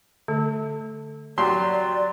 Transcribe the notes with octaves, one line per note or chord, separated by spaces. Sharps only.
D3 A3
F#3 G4 D5 C6